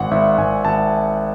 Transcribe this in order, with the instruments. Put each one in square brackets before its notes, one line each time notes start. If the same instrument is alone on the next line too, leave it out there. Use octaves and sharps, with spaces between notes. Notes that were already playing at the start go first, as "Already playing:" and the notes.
Already playing: [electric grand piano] G#1 F#5
G#1 E5
G#1 G#5
G#1 A5